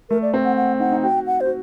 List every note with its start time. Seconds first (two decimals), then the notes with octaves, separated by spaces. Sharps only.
0.10 A3 A#4
0.22 D5
0.34 C4
0.45 F#5
0.56 F#5
0.80 D#4 F#5
0.92 D#4
1.03 F#4 G5
1.27 F#5
1.41 C5
1.46 F#4